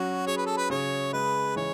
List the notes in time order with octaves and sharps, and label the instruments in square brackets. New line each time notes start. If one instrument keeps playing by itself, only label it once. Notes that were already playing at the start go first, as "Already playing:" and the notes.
Already playing: [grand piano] F#3 C#4 [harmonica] F#4
[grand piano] G#4 [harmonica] C#5
[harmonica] B4
A4
B4
[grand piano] C#3 [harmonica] C#5
[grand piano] G#3 [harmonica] B4
[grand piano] E3 [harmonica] C#5